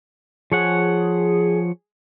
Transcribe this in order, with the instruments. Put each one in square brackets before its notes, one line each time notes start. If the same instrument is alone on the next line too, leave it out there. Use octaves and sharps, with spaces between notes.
[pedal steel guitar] F3 C#5 F#5 [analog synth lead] G#4